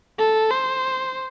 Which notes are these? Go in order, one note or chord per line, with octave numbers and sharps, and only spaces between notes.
A4
C5